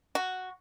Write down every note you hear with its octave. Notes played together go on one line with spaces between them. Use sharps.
F#4